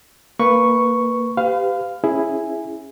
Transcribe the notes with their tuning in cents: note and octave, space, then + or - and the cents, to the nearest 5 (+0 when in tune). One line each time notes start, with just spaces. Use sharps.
A#3 -15 B4 +0 C#6 +0
G4 +0 B4 +40 F5 +0
C#4 -20 E4 +0 G#4 +0